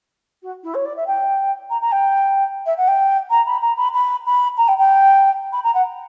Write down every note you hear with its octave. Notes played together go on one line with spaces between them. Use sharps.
F#4
E4
C#5
D5
E5
G5
A#5
A#5
G5
E5
F#5
G5
A#5
B5
A#5
B5
B5
B5
A#5
G5
G5
B5
A#5
F#5